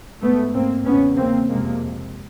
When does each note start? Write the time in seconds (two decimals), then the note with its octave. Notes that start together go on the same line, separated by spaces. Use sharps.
0.22 G#2 A3 B3
0.54 A#3 C4
0.84 E2 C#3 B3 C#4
1.16 A#3 C4
1.48 F2 C3 G#3 A#3